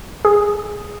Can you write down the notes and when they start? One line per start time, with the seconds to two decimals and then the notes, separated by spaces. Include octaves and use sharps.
0.25 G#4